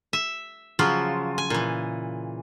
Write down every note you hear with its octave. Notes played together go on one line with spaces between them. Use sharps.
E5
C#3 F3 F#3 F4
G#5
A#2 E3